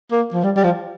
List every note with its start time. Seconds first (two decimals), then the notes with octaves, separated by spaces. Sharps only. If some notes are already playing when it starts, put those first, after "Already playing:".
0.11 A#3
0.33 F3
0.44 G3
0.57 G3
0.64 F3